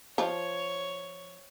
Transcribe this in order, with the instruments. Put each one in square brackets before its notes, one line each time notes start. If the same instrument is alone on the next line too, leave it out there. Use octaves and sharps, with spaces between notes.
[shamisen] F3 [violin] C#5